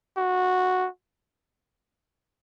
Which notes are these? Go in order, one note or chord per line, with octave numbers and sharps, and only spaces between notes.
F#4